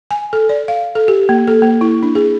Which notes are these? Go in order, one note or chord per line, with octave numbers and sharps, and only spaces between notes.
G#5
A4
D5
F5
A4
G4
A#3
A4
A#3
E4
D4
G#4